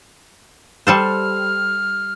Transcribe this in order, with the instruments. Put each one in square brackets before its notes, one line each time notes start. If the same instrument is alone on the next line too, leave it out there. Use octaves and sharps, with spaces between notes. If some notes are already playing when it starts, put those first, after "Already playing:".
[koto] G3 A4 C5 [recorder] F6